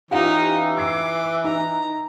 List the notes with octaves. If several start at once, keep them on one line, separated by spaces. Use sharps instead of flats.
E3 C#4 D#4 F4 G4
D6 E6 G#6 C7
D#4 A#5